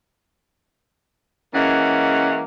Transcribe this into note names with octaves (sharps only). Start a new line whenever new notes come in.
E3 G#3 A#3 C#4 F#5